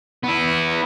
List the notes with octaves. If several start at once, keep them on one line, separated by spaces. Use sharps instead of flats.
B3 E4